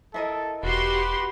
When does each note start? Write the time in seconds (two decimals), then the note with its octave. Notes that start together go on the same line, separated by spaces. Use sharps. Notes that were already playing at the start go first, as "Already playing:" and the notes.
0.14 E4 A4 A#4 D#5
0.63 E1 F#4 G4 B4 C6